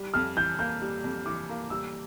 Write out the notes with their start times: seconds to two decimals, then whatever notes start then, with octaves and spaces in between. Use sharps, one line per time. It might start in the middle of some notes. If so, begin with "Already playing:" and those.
Already playing: G3
0.14 F2 F6
0.37 E3 G6
0.59 A#3 G6
0.82 G3
1.04 F2
1.26 E3 D6
1.49 A#3
1.70 G3 E6